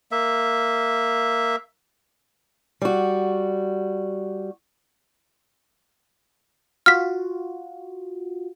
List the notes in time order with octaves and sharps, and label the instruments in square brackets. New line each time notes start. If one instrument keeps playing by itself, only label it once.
[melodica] A#3 E5
[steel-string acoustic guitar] G3 F#4
[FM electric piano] F4 F#4 [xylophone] F6 B6